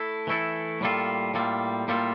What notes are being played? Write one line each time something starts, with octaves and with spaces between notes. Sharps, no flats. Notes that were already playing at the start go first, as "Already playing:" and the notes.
Already playing: A3 E4 A4
E3 A3 E4 A4
A2 G3 A#3 F4 A4
A2 G3 A#3 F4 A4
A2 G3 A#3 F4 A4